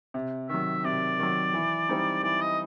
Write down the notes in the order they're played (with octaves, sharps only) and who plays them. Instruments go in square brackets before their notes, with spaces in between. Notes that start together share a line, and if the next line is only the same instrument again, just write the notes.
[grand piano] C3
[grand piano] D#3 F#3 [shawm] E5
[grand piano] C3 [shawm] D5
[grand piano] D#3 F#3
E3
G3 C4 D#4
[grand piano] E3 [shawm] D5
[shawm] D#5